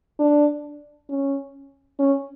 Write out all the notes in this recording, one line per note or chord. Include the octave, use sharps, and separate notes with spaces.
D4
C#4
C#4